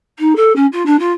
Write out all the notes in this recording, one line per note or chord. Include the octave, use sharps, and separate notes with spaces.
D#4
A4
C#4
F4
D4
F4